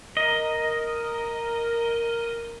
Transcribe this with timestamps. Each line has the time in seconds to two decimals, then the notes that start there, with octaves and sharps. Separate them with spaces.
0.17 A#4 D#5